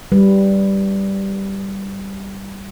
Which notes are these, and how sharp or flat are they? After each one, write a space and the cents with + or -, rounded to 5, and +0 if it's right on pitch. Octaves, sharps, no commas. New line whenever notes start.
G3 -5 B4 +0